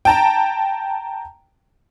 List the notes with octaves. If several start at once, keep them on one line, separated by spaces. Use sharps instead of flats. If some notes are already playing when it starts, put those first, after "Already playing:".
G5 A5 A#5